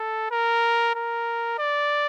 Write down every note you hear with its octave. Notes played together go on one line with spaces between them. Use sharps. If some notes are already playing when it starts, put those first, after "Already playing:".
Already playing: A4
A#4
A#4
D5